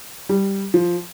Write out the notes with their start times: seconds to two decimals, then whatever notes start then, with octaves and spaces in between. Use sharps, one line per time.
0.29 G3
0.74 F3